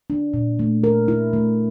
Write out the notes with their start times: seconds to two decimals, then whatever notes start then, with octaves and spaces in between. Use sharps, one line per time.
0.10 D4
0.34 A#2
0.59 A3
0.84 A#4
1.08 E4
1.33 A3